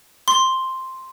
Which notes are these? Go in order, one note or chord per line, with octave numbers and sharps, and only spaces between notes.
C6